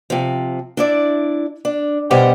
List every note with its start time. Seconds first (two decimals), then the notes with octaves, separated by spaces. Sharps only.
0.10 C3 F3
0.77 D4 E4 D5
1.65 D4
2.11 B2 G3 G4 C5 F#5